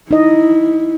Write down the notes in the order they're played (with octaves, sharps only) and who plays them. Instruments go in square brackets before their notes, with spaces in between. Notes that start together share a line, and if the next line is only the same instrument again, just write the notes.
[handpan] D#4 D#5 [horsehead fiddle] E4